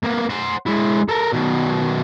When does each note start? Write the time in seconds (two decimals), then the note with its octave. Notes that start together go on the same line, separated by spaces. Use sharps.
0.03 A#3 B3
0.30 C5 F#5
0.67 G#3 E4
1.09 A4 A#4
1.33 B2 D#3